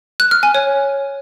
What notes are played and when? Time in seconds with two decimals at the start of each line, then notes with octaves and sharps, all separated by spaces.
0.20 F#6
0.31 F6
0.43 G#5
0.55 C#5